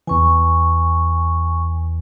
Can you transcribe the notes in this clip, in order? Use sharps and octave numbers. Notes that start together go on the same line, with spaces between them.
E2 E3 G#5 C#6